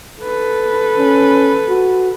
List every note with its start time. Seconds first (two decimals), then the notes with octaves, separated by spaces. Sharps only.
0.22 A4 B4
0.98 C#4
1.69 F#4